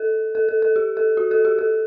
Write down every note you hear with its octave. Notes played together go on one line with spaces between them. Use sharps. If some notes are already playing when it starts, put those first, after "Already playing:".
Already playing: A4
A4
A4
A4
G4
A4
F#4
A4
G4
A4